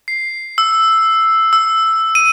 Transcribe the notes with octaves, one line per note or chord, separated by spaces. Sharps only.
C7
E6
E6
D#7